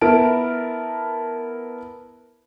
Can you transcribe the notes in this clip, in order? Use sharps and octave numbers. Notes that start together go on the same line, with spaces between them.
B3 E4 A#4 A5 D7